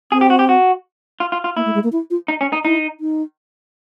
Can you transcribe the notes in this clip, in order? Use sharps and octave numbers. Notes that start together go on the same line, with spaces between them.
C4 G#4
G4
F#4
G4
F#4
F4
F4
F4
A#3 E4
A3
G#3
A#3
E4
F4
D#4
C#4
D#4
D#4 E4
D#4